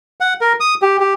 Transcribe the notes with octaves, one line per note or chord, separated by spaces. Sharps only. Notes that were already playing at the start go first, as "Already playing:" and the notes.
F#5
A#4
D#6
G4
G4